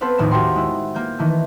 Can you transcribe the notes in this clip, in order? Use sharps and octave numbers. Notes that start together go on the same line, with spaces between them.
B3 C4 A4 B4 C5 F5
A#1 D#2 A2 E7
F#4 G4 A4 A#4 G5 C6
G#3 E4
A#3 G6
D#3 E3 A3